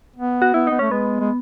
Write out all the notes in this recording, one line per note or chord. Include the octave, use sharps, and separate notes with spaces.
B3
F#4
B3 E4
B3 D#4
A3 C#4
G#3 B3
G#3